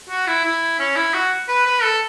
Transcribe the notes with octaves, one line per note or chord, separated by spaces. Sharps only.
F#4
E4
E4
C#4
E4
F#4
B4
B4
A4